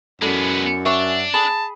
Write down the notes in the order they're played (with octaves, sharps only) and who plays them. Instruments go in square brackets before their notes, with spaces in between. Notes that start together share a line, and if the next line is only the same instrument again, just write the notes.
[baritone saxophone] F#2 [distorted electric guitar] G#3 B3 [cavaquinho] E4 A4 D5
[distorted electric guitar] D4 [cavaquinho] C#5 F#5 D6 [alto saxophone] E5
[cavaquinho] G#4 B5 [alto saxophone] A5